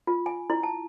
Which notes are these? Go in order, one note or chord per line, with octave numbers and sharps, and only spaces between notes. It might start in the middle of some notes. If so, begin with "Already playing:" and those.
F4
G#5
E4
A5